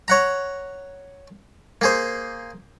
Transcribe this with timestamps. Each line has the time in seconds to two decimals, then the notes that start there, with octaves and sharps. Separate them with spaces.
0.08 C#5 F#5 A#5
1.81 A#3 G#4 C5